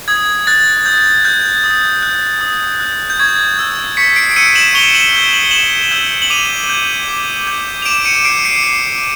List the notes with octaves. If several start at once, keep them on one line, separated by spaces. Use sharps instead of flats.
D#6 G#6
F#6 A6
D#6 G6
F#6 G6
D#6
F#6
D#6
F#6
G6
C#6 G#6
E6 G6
C#6 B6 C#7
C7 D7
D7
E6 G6 C#7 D#7
E7 F#7
C#6 F7 G7
E7 F#7
E6 G6
F#7
G7
C#6 E7 F#7
E6 G6
F#7
D6 D#7 F7
G6
D6
G6
F7
D6 D7 E7
C#7 D#7
G6 C7 D7
C7 D7
D6 C7